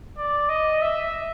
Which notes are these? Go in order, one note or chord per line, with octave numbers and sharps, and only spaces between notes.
D5
D#5
E5